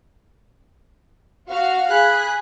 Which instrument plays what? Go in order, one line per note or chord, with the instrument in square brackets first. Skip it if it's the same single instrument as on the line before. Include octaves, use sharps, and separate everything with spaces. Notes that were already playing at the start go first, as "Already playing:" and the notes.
[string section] F#4 F5
[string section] G#4 [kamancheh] B5 F#6